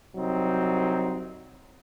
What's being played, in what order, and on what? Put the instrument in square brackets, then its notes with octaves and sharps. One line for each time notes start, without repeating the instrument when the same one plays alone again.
[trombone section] C2 F#3 C4 D#4